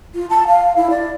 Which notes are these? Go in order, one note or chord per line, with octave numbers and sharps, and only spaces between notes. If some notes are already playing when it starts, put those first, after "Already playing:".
F4
A5
F5
E4
D5